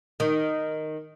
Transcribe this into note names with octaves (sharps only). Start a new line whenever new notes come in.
D#3